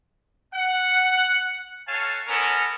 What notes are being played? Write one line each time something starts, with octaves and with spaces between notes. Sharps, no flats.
F#5
F#4 A4 C#5 F5 G#5 A5
G#3 B3 C#4 A4 A#4